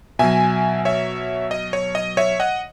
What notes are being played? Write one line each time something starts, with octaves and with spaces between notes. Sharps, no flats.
B2 F#3 E5 G#5
C#5 E5
D#5
C#5
D#5
C#5 E5
D#5 F#5